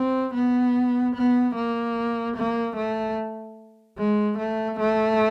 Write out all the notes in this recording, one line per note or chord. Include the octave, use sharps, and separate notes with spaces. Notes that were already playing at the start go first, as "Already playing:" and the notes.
Already playing: C4
B3
B3
A#3
A#3
A3
G#3
A3
A3